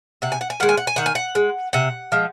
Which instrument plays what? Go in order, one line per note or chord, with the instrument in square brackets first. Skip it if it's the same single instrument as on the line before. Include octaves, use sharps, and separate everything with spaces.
[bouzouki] C3 F#5
G#5
F#5
G#5
D#3 G#3 F#5
G#5
F#5
G#5
D#3 F#5
G#5
F#5
G#3
C3 F#5
F3 G#3